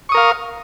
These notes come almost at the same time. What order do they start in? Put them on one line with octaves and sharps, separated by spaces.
C#6 D#6 A#4 F5